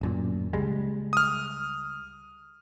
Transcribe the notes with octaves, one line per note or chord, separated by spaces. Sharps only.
D1 F#2 A#2
C#2 G3 G#3
D#6 F6